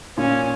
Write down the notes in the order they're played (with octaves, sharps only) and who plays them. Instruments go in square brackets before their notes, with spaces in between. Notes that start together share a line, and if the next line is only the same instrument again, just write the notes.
[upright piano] A#2 [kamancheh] C#4